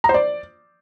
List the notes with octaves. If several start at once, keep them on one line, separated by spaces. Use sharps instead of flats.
A#5
C5
D5